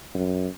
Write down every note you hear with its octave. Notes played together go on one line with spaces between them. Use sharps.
F#2